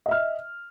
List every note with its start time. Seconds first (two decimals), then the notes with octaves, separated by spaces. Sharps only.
0.06 D#5
0.09 E5
0.11 F6